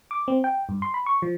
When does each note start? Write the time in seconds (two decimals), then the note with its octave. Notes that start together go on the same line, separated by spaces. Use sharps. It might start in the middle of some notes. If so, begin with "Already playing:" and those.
0.11 D6
0.28 C4
0.44 G5
0.69 G2
0.82 C6
0.94 B5
1.06 C#6
1.22 F3